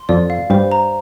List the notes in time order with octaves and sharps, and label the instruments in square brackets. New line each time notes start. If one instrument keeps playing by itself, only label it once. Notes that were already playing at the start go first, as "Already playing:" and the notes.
Already playing: [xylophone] C6
[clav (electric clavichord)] F2 F3 [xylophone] D5
[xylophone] F5
[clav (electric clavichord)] G2 G3 [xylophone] C5
[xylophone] A#5